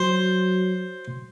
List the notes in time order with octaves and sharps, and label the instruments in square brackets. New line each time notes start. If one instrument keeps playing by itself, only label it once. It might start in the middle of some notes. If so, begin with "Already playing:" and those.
Already playing: [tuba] F#3 [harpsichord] C5